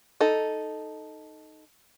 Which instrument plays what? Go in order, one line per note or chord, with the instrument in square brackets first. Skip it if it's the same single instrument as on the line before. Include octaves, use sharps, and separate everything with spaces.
[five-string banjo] D#4 A4